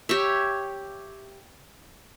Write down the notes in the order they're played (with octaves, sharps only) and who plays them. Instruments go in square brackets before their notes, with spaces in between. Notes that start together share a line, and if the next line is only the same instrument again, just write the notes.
[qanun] G4 C#5 E5